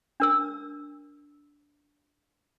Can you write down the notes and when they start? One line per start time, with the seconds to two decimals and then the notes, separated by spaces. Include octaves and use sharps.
0.20 D4 A#4 E6